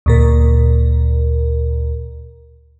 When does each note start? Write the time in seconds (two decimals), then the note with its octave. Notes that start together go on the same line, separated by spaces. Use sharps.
0.06 D2 A#2 A#4